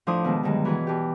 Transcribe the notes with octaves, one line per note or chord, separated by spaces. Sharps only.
A2 F3 D4 E4 C6 D#6
B2 D#3 G#3
G2 D3 D#3 F#3 G#3
E3 F#4 G#4 B4
B2 G4